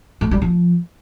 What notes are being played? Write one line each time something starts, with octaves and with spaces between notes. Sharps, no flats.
A3
G3
F3